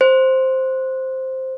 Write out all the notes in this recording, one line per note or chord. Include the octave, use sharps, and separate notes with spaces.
C5